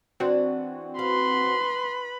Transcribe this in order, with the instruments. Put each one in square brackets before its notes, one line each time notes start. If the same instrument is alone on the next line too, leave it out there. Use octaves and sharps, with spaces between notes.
[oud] E3 D4 [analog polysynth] C4 F#4
[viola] B4 B5 [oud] F5 [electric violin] C6